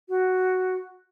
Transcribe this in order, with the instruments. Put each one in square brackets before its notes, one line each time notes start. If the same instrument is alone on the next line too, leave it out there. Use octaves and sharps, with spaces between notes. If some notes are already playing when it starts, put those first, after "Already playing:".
[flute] F#4